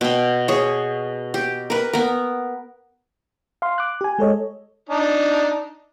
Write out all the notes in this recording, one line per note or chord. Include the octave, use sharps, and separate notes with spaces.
B2 G5
G#4 C#5
G4
A#4 B4
B3 A#4
F5 C6
D6 F#6
G4 G#5
G#3 A4 C#5 D#5
D4 D#4